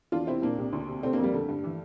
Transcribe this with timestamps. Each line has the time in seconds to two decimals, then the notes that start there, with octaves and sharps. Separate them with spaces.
0.12 E2 D4 F4
0.27 C3 C4 E4
0.42 A#2 A#3 D4
0.58 C2
0.73 D2
0.88 C3
1.03 C3 A3 C4
1.13 A#3 D4
1.18 F2
1.23 G3 A#3
1.33 D3 A3
1.48 G2
1.64 E3